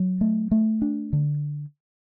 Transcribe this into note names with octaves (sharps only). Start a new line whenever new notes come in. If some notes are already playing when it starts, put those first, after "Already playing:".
Already playing: F#3
A3
A3
D4
D3